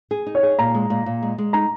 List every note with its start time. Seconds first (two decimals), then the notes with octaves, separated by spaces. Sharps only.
0.11 G#4
0.26 D#4
0.35 C#5
0.43 G#4
0.59 A#2 A#5
0.74 G#3
0.90 A#2
1.06 A#2
1.22 G#3
1.38 G#3
1.53 D#4 A#5